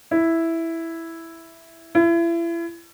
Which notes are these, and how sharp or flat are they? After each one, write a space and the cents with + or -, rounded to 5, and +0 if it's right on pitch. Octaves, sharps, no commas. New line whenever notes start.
E4 +0
E4 +35